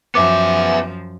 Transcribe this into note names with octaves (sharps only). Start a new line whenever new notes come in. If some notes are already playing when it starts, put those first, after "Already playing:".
F#2 F3 B3 E5 D6